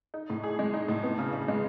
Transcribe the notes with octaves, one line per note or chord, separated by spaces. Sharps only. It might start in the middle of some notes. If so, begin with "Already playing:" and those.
D#4
A2
G#4
G#3
D#4
A2
B3
C#3
C#3
G#3